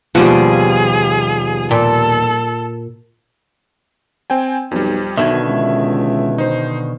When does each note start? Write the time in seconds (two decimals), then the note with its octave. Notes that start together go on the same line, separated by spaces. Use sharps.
0.15 D#2 B2 F3 G3 G#4 F#5
1.71 A#2 A4
4.30 C4 G5 G#5
4.71 B1 F2 G3
5.18 B1 B2 D3 D#3 E5 G#6
5.48 C#2
6.38 D#4 C5